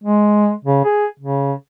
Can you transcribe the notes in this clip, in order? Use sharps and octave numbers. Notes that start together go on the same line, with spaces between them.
G#3
C#3
G#4
C#3